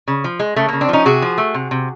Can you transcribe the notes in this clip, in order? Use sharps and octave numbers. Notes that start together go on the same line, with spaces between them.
C#3
F3
G#3
C#3 A3
C#3 A#3
C4 D4
F3 C#4 D#4
C3 F#4 G#4
F3
A3
C3
C3